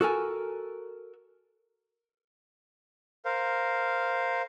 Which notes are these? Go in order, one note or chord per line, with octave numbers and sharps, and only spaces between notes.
F#4 A4 A#4 G#5
A#4 C5 F5